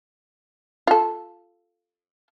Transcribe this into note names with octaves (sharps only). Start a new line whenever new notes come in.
F4 A4